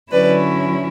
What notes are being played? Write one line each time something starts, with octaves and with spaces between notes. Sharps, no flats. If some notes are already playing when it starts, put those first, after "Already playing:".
D3 F#3 C#4 E4 B4 D5